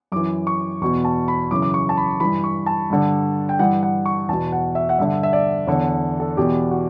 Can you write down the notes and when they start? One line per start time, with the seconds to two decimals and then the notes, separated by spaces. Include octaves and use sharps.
0.12 F#2 E3 D6
0.47 C#6
0.81 E2 B2 C#6
1.05 A5
1.28 B5
1.51 F#2 C#3 E3 D6
1.62 D6
1.74 C#6
1.89 A5
1.97 B5
2.20 G2 E3 B5
2.44 C#6
2.66 A5
2.90 G2 D3
3.49 G5
3.59 G2 E3 F#5
3.83 F#5
4.06 C#6
4.29 E2 B2 A5
4.52 F#5
4.75 E5
4.89 F#5
4.98 G2 D3 E5
5.23 E5
5.33 D5
5.67 E2 D3 C#5
6.20 A4
6.37 E2 B2 G4
6.71 F#4